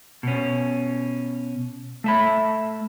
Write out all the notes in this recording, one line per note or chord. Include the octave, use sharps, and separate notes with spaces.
B2 C#4
A3 E5 B5